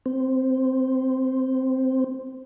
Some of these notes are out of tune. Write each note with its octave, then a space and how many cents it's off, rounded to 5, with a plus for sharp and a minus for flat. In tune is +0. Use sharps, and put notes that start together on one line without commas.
C4 -5